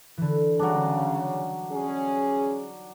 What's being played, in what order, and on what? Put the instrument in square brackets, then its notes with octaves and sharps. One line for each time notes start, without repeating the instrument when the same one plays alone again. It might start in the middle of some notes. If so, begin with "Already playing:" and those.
[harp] D3 E3
[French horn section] C#3 [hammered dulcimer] F#3 D4 [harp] G3 D#4
[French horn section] C#4 G#4